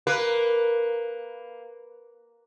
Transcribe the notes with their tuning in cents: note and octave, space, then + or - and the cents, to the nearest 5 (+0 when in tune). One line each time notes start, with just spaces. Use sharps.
A#3 +0 B4 +0